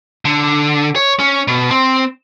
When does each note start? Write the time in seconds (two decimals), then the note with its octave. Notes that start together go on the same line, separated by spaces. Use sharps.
0.25 D3
0.96 C#5
1.20 C#4
1.48 B2
1.71 C4